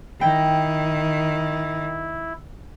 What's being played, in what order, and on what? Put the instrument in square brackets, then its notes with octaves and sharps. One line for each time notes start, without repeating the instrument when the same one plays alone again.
[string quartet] D#3 [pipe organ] E4 [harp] G5